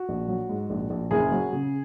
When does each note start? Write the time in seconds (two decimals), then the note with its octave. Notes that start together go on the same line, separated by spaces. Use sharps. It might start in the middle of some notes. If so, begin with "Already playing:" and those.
Already playing: F#4
0.09 A#1
0.28 F#3
0.49 G#2
0.70 A#1
0.90 A#1
1.11 F#1 G#4
1.32 F#3
1.53 C#3